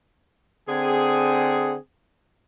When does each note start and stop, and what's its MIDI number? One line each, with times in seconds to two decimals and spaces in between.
0.69 1.77 50
0.69 1.77 60
0.69 1.77 68